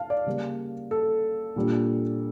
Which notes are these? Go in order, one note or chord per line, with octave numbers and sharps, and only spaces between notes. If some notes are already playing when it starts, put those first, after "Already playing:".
Already playing: F5 A5
D5
C#3 G3 A#3
A4
A#2 G3 D4